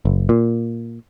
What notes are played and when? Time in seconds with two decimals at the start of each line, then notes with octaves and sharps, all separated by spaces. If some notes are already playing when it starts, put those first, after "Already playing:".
0.05 F#1
0.29 A#2